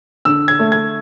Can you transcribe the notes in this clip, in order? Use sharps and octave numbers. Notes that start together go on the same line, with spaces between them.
D3 E6
G#6
A3
G#6